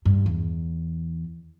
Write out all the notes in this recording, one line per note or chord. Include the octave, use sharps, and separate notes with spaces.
G2
E2